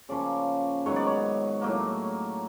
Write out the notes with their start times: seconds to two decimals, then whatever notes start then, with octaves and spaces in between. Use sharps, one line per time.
0.09 C#3 F3 A#3 C#4 D5
0.86 G#2 D#3 F#3 B3 C#5
0.96 D5
1.07 C#5
1.62 A2 F#3 A#3